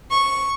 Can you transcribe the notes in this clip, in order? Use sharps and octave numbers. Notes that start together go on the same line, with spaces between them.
C#6